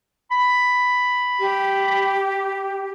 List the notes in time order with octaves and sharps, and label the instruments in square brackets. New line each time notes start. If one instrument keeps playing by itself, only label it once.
[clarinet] B5
[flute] G4